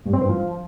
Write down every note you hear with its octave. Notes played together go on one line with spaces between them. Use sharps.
G2
C4
G2
F3